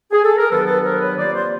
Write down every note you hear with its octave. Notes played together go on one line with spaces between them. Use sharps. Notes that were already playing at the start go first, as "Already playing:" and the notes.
G#4
A4
A#4
G2 D#3 F#3 B3 A4 B4
A4 B4
A#4 C5
B4 C#5
C3 F3 A#3 C5 D5
C5 D5